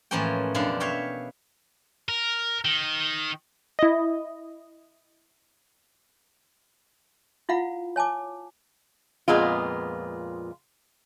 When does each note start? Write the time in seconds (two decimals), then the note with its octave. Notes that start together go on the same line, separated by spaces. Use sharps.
0.11 A2 E3 F3 A#3 C#4 G5
0.54 F#2 B2 F3 D4 G4 F5
0.80 C#5 E5 F5 G5
2.09 A#4
2.65 D#3
3.79 E4 D#5
7.49 E4 F4 F5 F#5 B5
7.96 C#5 G#5 A5 D6
9.28 F2 A#2 G#3 B3 F4